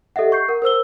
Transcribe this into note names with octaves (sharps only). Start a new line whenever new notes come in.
G4 A4 D#5 E5 F#5
C#6 G6 C7
A#4 F#5
A#4 C5 E6 G7